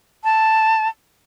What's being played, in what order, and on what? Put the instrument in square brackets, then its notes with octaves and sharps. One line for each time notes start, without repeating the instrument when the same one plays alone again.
[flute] A5